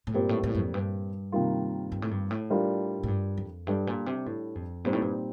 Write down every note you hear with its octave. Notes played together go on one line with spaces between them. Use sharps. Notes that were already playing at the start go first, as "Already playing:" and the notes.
A2
G2 A#2 G3 C4 G4 A#4
A2
A2
G2
F2
G2
C3 D#3 G3 A#3 F4
G2
A2
G2
A2
G3 D4 F4 A#4
A2
G2
F2
G2 G3 D4 A4
A#2
C3
A2
F2
G2 A#2 G3 C4 D#4
A2
G2